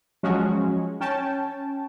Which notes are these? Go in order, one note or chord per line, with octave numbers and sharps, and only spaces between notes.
F3 F#3 G#3 C#4 F#4
C#4 G5 A5